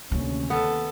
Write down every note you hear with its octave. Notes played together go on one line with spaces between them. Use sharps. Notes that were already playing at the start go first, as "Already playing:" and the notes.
D2 C3 D#3 A#3 C#4
B3 A4